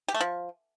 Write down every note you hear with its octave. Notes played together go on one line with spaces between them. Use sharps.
G4
A3
F3